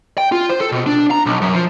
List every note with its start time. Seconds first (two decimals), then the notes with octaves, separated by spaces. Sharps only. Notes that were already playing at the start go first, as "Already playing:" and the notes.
0.18 G5
0.32 F4
0.50 C5
0.61 A4
0.72 B2
0.86 D4
1.11 A#5
1.26 B1
1.41 F#2
1.55 F3